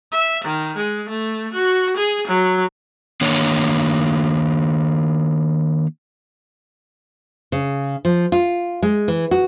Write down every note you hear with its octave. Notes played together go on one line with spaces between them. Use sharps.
E5
D#3
G#3
A3
F#4
G#4
F#3
D#3 A#3 D4 C#5
C#3
F3
F4
G#3
E3
F#4